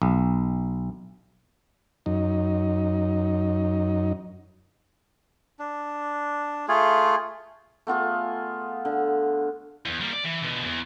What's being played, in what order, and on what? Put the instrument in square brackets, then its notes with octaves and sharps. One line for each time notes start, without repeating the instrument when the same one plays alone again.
[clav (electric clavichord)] B1
[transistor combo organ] F#2 D#4
[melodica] D4
A3 F4 G#4
[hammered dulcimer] A3 B3 F4 G#4
D3
[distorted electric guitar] E2
G3 A#3
D5
E3
B2 D3
E2